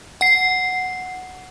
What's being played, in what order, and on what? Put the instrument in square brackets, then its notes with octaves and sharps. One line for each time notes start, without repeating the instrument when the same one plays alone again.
[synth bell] F#5 C7